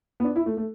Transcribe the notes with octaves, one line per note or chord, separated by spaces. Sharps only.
B3
D4
E4
A3
A3